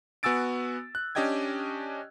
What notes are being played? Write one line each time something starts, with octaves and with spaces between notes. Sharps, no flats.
B3 F#4 G#5 E6 A6 D7
F#6
C#4 D4 G4 D#5 G5 G#6